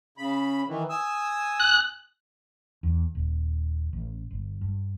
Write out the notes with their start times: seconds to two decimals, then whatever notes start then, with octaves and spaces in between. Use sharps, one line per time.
0.18 C#3 B5
0.68 D#3 E3
0.90 G#5 D#6 E6
1.60 F#6
2.83 E2
3.15 D#1
3.93 A1
4.31 G1
4.61 G2